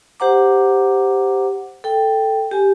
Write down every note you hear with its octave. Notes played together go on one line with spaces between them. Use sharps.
G4 C5 F#5 A#5 D6
A4 G5
G4 G#5